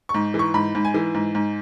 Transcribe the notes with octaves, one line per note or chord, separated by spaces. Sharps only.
C#6
G#2
E3
C#6
G#2 B5
G#2
G#5
E3
G#2
G#2